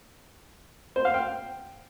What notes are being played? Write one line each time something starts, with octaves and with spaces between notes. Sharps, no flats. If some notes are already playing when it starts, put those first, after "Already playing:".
C5
F5
G5